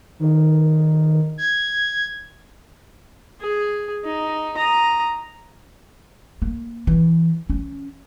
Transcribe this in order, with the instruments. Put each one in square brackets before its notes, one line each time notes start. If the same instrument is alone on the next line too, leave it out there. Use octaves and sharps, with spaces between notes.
[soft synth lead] D#3
G#6
[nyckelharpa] G#4
D#4
A#5 D#6
[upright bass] A#3
E3
C#4